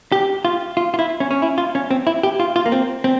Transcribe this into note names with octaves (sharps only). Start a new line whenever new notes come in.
G4
F4
F4
F4
E4
C#4
C#4
E4
F4
C#4
C4
E4
G4
F4
F4
A#3
C4
C4